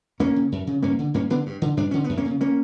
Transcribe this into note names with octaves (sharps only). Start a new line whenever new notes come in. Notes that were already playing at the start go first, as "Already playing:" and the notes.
F#2 A#3 C#4
C#3
F#2
C#3
G2 A#3 C#4
D3
G2 A#3 C#4
D3 B3 D4
G2
D3
G2 D4
D3 C#4
B3
F#2
A#3 C#4
C#3
A#3 C#4